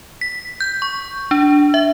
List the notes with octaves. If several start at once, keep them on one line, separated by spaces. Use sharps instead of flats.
B6
G6
C#6
D4
E5